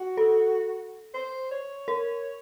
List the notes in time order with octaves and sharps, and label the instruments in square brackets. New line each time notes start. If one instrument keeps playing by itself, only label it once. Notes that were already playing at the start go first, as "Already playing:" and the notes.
Already playing: [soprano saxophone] F#4
[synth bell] A4
[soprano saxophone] C5
C#5
[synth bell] A#4